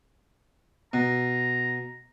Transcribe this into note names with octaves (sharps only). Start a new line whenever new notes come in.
B2 A#5